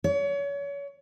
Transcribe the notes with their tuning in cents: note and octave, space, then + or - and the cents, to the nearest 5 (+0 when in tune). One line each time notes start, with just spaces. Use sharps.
C#5 +30